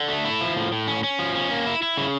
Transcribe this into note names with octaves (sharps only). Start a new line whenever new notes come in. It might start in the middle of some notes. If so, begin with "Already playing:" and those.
Already playing: D3
A3
E4
F3
A2
A2
C#4
C#4
F3
C#4
A#3
E4
E4
C#3